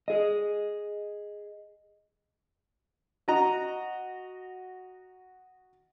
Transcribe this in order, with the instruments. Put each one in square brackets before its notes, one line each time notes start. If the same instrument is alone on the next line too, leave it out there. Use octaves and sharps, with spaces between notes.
[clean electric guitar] G#4 D#5
[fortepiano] F#4 D#5 A#5